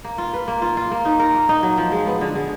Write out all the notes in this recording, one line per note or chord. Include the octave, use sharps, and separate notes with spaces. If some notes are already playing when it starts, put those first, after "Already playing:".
A#3
F4
B4
A#3
F4
F4
A#3
D#4
A#4
A#3
D#4
F#3
F3
G#3
B3
D3
G#3